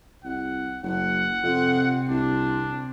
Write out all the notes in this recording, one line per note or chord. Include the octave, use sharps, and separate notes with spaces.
C2 F#5
F#1 F#5
F2 C3 C4
C2 D4